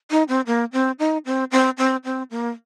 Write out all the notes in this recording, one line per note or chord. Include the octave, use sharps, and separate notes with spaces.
D#4
C4
A#3
C4
D#4
C4
C4
C4
C4
A#3